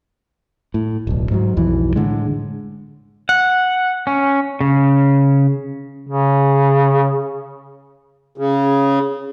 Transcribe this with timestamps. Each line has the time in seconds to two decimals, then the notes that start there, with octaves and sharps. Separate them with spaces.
0.74 A2
1.07 D1 B1
1.32 G#2 F#3
1.57 B1 F2 E3
1.96 A2 D3 G#3
3.29 F#5
4.07 C#4
4.61 C#3
6.07 C#3
8.38 C#3